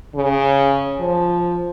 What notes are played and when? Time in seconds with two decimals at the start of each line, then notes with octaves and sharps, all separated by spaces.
0.15 C#3
1.00 F3